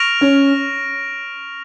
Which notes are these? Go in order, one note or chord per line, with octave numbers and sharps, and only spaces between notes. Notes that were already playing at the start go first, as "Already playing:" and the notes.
Already playing: C#6 F6 A#6 D7 F7
C#4